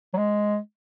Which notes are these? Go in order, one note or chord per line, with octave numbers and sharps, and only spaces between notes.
F#3
G#3